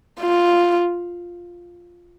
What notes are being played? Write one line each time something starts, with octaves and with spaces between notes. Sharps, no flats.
F4